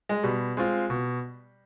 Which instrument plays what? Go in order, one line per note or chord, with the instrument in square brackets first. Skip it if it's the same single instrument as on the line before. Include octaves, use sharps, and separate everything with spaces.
[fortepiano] G#3
[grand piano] B2 [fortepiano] G3
[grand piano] G#3 C4 F4
B2